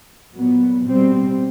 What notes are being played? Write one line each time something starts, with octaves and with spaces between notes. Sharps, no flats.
A#2 F#3 B3
B2 G3 C4